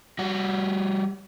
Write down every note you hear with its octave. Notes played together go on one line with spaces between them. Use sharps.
G3 F#4